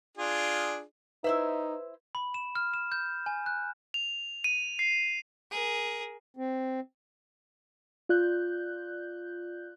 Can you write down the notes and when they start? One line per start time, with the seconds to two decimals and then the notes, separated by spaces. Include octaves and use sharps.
0.17 D4 F4 G#4
1.24 D#4 E4 B4 C5 E5
2.15 B5
2.34 E7
2.55 F6
2.74 E7
2.92 G6
3.26 G#5
3.46 F#6
3.94 F7
4.44 D#7
4.79 C7
5.51 G#4 A#4
6.37 C4
8.09 F4 D5 F#6 G6